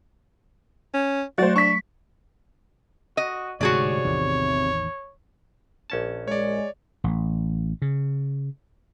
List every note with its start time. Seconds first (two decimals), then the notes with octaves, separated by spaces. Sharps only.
0.94 C#4
1.38 F#3 A3 F#4 C5 D5
1.56 D4 C#6 B6
3.17 F#4 D#5
3.61 D1 D2 G#2 C3 F#4 G#4 C#5 D5
4.04 A1 E2 D#3
5.90 A#1 C#4 A5
6.28 G#3 C#5 D5
7.04 A1
7.82 C#3